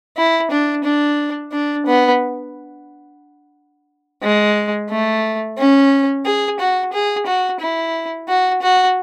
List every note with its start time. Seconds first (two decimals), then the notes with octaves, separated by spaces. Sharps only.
0.17 E4
0.51 D4
0.84 D4
1.52 D4
1.86 B3
4.23 G#3
4.90 A3
5.58 C#4
6.25 G#4
6.60 F#4
6.93 G#4
7.26 F#4
7.60 E4
8.28 F#4
8.62 F#4